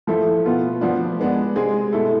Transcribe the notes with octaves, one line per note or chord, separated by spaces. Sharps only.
A2 F3 A3 E4 A4
B2 B3 F4
F3 B3 D4
G#3 B3 D4
C3 G#3 C4 G#4
B2 A3 E4 A4